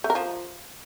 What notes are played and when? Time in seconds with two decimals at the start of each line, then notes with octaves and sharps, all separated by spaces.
0.04 A3
0.10 A#4
0.15 F3